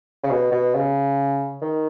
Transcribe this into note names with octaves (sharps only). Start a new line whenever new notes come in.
C#3
B2
B2
C#3
D#3